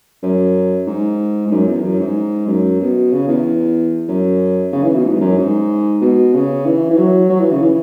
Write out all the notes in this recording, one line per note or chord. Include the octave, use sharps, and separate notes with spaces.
F#2
G#2
G#2
F#2
E2
F#2
G#2
F#2
B2
C#3
E2
F#2
C#3
E3
B2
G#2
E2
F#2
G#2
B2
C#3
E3
E3
F#3
F#3
E3
C#3
E3